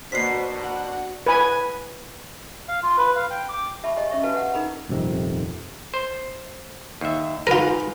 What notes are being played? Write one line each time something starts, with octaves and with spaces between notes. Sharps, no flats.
B2 A#3 D4 F#4 C5 B6 C7
F#4 F#5
B4 G#5
F5
F4
B4
F5
G5
D6
G4 E5 A5 B5 C#6
G4 G#4 C#5 D#5 G#5
C#4 E5 C#6
F#4 G4 B4 F5 G#5 A5
G4 F#5
D#4 G#4 A#4 A#5 B5
D#1 F2 C3 D#3
C5
D#2 E5
G#2 F4 A#4 B4